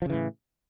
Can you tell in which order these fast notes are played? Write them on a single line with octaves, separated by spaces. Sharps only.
F3 C#3 E3 A2